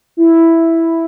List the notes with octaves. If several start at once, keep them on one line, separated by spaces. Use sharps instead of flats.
E4